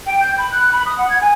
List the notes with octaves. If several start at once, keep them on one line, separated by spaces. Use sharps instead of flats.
G5
G6
B5
F#6
B5
D#6
F#5
G#6
G#5